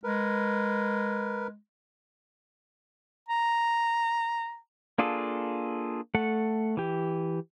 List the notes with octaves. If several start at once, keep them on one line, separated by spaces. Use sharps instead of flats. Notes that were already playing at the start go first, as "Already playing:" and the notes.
G#3 A#4 B4
A#5
A#3 D4 F4 G#4 A4
A3 A4 F#5
E3 G4